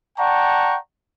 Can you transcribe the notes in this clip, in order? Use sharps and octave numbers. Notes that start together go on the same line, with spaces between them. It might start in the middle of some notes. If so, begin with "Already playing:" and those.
D5 F#5 G5 A5 A#5 C#6